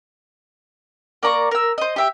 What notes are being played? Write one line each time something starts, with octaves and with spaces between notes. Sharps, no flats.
A#3 D5 A#5 C#6
A#4 E6
C5 D#5
G4 E5 G5